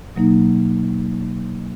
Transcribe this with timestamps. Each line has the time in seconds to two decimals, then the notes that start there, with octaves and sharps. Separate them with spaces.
0.16 B2 F#3 A#3 D#4